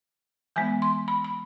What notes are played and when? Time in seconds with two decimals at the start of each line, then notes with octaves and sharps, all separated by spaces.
0.56 E3 G#3 B3 G#5
0.82 C6
1.08 B5
1.24 B5